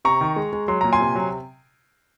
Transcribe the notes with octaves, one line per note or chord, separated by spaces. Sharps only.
C3 A#5 C#6
D#3
G#3
G#3
F#3 C6
A#2 A#5
G#5 C6
C3
F#3